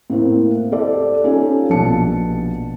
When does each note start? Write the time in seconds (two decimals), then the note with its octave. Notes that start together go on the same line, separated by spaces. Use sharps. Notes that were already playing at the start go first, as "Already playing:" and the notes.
0.10 A2 A#3 C4 E4
0.72 G4 A4 C5 D5
1.24 C#4 D#4 F4 G4 A4
1.70 A#1 B2 B3 A5 C#7